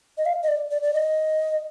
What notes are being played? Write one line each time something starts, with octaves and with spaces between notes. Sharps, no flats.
D#5
F5
D#5
D5
D5
D5
D#5